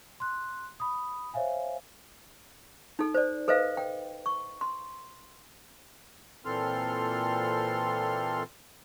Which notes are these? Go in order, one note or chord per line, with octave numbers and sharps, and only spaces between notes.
C6 F#6
B5 D#6
C5 C#5 E5 F5 G#5
D#4 A4
C5 D5
A4 B4 C5 D#5 F5
G5
C#6
C6
A#2 E3 C4 A4 C6 F6